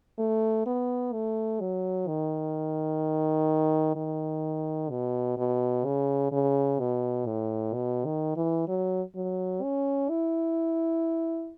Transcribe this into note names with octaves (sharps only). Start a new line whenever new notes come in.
A3
B3
A3
F#3
D#3
D#3
B2
B2
C#3
C#3
B2
A2
B2
D#3
E3
F#3
F#3
C#4
E4